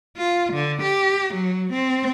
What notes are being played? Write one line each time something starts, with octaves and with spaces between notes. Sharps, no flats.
F4
D3
G4
F#3
C4